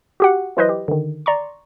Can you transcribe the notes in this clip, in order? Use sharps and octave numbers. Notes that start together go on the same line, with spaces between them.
F#4 G4 F#5
E3 F#3 E4 B4 C5 D#5
G4
D3 D#3
D5 A#5 C6 C#6